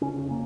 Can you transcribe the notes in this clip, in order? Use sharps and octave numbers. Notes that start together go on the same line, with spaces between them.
C#3 C#4
F1
A#3